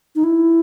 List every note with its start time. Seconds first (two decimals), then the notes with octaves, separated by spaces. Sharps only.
0.15 D#4
0.24 E4